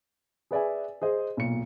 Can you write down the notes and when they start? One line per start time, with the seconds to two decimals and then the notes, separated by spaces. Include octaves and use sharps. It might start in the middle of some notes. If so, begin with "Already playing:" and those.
0.51 G#4 B4 D5 E5 G#5
1.02 G#4 C5 D#5
1.37 B1 A#2 C#7